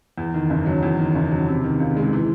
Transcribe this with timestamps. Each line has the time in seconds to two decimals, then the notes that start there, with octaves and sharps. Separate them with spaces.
0.18 E2
0.34 D#3
0.50 F#1
0.66 F#3
0.83 E2
0.99 D#3
1.15 F#1
1.32 F#3
1.47 C3
1.64 D#3
1.80 C#2
1.97 G#3
2.13 E3